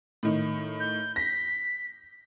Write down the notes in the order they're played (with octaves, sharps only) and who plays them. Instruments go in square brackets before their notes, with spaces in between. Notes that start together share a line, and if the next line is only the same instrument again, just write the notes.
[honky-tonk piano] A2 D#3
[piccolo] G6
[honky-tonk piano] A#6 [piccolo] B6